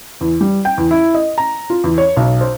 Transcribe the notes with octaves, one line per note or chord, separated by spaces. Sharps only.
E2
G3
G5
E2
E4
D#5
A#5
F4
E2
C#5
B1
C5